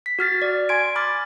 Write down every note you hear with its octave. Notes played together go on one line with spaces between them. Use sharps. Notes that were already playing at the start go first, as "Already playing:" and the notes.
B6
F#4 F6 A6
D5
G#5 C6 G#6 D7
B5 D6 F6 A6